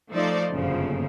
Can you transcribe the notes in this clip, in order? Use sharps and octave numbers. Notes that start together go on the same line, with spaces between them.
F3 A3 D#4 C5 D5
G1 F#2 A#2 C#3 F3